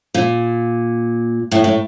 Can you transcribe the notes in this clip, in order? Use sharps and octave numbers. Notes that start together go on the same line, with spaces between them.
A#2
A2
A2